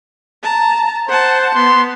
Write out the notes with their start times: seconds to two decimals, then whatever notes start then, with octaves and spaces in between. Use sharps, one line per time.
0.43 A5 A#5
1.09 C5 F#5 A5
1.55 B3 C6